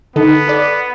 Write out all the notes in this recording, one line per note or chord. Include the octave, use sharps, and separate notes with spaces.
D3 B3 D#4 A4
A4 D5